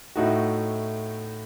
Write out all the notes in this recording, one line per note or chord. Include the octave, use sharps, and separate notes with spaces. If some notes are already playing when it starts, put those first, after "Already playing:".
A2 A3 D#4 F#4